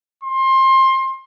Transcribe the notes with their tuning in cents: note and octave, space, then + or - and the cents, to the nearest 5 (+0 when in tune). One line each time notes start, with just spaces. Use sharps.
C6 +25